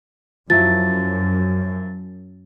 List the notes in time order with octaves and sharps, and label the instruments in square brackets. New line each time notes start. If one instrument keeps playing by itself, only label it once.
[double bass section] F#2 [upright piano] F3 F#3 E4 [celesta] A6